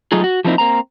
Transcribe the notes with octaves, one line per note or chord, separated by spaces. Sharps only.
F#3 A3 D#4 F4 G#4
F#4
F3 A3 A#3 C4 D#4 E4
A#3 C4 A#5